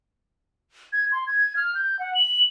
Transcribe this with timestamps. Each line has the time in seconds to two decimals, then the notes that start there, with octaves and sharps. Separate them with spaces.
0.93 G#6
1.12 C6
1.27 G#6
1.56 F6
1.75 G6
1.99 F#5
2.15 F#7